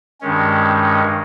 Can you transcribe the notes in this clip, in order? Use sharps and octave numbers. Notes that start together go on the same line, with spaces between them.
G2 D#3 G#3 C#4